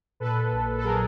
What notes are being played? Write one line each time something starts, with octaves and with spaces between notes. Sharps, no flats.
A#2 A4 B4
A#1
A4
F#3 G#4 A#4